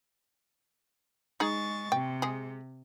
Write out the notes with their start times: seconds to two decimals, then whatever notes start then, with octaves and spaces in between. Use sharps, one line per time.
1.40 G#3 D#4 G#4 C#6 A6
1.92 C3 G5
2.22 G#3 G#4